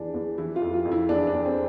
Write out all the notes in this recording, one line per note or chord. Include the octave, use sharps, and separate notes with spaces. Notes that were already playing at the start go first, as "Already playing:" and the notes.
Already playing: E2 E3 D4
E2
E3 E4
F4
F2
F4
F2
E4
E2 D4
D4
E2
C4